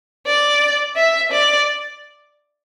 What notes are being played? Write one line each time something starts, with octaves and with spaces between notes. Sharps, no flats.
D5
E5
D5